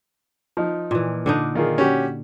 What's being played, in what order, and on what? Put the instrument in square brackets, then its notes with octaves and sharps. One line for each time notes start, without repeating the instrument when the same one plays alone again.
[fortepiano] F3 D#4
[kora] A#2 E3
D3 D4 D#4
[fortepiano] D#3 F4 G#4
C#4 F#4 G4